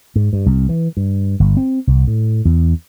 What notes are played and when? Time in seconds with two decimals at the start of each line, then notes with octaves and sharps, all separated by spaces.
0.16 G#2
0.33 G2
0.46 C2
0.69 E3
0.97 G2
1.40 G1
1.57 C4
1.87 C2
2.07 A2
2.45 E2